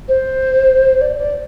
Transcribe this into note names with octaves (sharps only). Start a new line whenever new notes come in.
C5
D5
D5